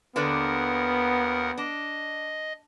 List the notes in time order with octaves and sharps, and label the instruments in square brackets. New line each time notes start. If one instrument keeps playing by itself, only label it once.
[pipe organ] D#2 A#4 F#5 [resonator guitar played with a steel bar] D3 B4 D5 [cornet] B3
[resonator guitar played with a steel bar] D4 [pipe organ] D#5